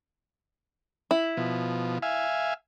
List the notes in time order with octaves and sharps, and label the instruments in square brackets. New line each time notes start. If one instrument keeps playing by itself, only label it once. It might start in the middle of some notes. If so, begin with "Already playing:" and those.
[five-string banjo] E4
[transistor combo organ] B2 F3
E5 F5 G#5